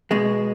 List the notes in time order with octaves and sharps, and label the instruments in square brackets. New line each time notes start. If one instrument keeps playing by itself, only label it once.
[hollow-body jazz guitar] B2 G#3